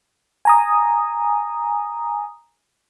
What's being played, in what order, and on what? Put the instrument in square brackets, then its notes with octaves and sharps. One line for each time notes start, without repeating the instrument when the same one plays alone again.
[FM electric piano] G#5 A#5 D#6